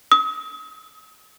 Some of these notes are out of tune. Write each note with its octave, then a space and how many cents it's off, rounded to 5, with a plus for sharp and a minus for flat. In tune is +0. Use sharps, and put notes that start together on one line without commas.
D#6 +40